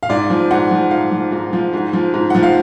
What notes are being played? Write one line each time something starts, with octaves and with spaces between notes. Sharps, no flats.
F5
G#2 D5
F3
G#2 F#5
F3
G#2 F5
F3
G#2
F3
G#2
F3
G#2
F3 F#5
F5